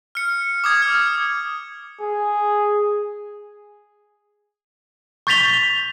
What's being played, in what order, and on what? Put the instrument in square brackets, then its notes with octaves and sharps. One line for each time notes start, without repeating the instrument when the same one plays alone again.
[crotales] F6 C#7
D6 D#6 G#6
F6
[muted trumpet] G#4
[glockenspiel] C#6 G6 A6 B6 F7 G7